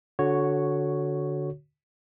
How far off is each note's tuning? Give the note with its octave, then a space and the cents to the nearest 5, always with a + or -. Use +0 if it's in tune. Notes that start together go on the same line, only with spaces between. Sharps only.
D3 -10 F#4 +0 C#5 +0